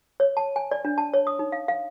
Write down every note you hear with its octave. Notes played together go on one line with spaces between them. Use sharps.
C#5
A5
G#5
D5
D4
A5
C#5
D#6
D#4
F5
F5